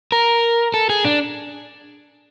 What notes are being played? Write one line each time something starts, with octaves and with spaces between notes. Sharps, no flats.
A#4
A4
G#4
D4